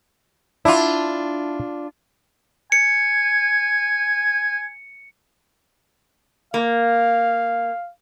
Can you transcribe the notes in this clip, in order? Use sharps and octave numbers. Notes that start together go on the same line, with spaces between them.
D4 E4 F4
G#5 C#7
A#3 F5